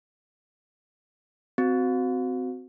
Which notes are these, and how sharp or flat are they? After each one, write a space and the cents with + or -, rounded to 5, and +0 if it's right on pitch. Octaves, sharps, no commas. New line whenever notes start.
C4 -25 F#4 +0